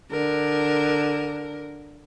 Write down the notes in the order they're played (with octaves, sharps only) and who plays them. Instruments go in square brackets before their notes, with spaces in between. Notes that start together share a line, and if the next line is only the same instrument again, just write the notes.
[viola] D3 A#4